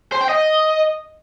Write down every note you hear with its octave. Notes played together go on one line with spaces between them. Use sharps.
C5
G5
D#5